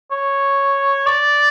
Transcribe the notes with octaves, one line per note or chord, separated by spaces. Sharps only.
C#5
D5